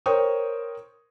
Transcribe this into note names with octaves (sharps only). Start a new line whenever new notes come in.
A#4 C5 C#5 G5 C#6 D#6